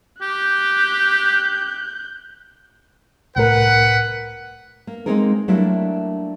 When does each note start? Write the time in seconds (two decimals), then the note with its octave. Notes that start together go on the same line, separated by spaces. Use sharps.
0.22 G4 F#6 G6
3.36 C2 A2 A#4 B4 F#5
4.87 A#3
5.06 G#3 A#3 C4 D#4 G#4 A#4
5.48 F#3 G3 A3 A#3 D4 E4